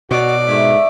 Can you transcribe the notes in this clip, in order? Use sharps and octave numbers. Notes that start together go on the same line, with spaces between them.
B2 D4 D#4 F#4 C#5 D5 D6
G#2 A3 E4 E5